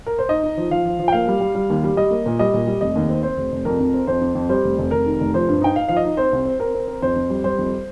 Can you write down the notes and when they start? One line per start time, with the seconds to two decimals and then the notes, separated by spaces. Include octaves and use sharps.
0.06 A#4
0.19 C5
0.29 D#4 D#5
0.43 D#4
0.57 F3
0.71 F3 F5
0.85 F3
0.99 F3
1.08 G5
1.12 A#3 F5
1.28 G3
1.41 G3
1.55 G3
1.70 D#2
1.84 G3
1.97 G3 D#5
2.11 A#3
2.26 A#2
2.39 G3 D#5
2.54 A#2
2.67 G3
2.81 F1 D#5
2.96 D#2
3.09 C4
3.23 C4 C5
3.37 F1
3.52 F1
3.65 F2 A#4
3.80 F2
3.94 C4
4.07 F2 C5
4.21 F2
4.35 F2
4.49 G3 C5
4.64 F1
4.78 F1
4.91 F1 A#4
5.06 D#3
5.20 F1
5.34 F3 C5
5.48 G2
5.61 D#4 G5
5.76 D#4 F5
5.88 F3 F5
5.97 D#5
6.04 D#4
6.17 C4 C5
6.33 C2
6.45 C4
6.60 C4 A#4
6.75 C4
6.88 C4
7.02 F2 C5
7.16 F2
7.30 G3
7.44 G3 C5
7.58 F2